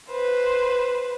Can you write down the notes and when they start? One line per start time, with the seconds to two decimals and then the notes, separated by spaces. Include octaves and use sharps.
0.10 B4 C5